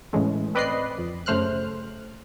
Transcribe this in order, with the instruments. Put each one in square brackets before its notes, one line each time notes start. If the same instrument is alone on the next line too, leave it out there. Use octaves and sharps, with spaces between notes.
[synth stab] A2 C#3 E3 G#3 A3
C4 B4 D5 D#5 F#6 C7
F2
F#2 C#3 A3 C5 F6 F#6